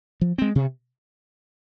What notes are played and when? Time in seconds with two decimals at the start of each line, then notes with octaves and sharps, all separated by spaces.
0.21 F3
0.38 G#3 C4
0.55 C3